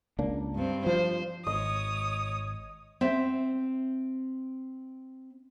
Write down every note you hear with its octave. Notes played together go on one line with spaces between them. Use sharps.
C#2 A#3 D4
G2 C4
F3 C5
G#1 C#5 D#5 D#6
C4 E5